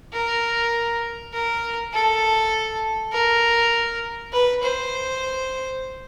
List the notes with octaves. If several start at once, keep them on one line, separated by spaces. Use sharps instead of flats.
A#4
A#4
A4
A#4
B4
C5